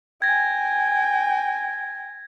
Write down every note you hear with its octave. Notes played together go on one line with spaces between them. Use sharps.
G5 G#5 G#6 A#6